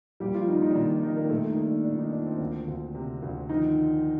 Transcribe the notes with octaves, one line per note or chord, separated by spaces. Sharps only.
A#2 G3 G4
F3 F4
D#3 A#3 D#4
D#3 D#4
D4
A#2 D#3 D#4
D4
D#3 G3 D#4
A#3 A#4
A#2 A3 A4
D#3 D#4
A#3
D4
A#2 D4
D#3 D#4
A#2 D4
C4
D2
D2
C3
D2
D#3 F3 D#4